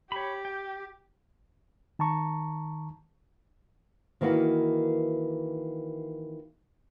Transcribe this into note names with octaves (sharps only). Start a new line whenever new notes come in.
G4 C#5 B5
G5
D#3 A5 A#5 C#6
D#3 E3 A#3 F#4 B4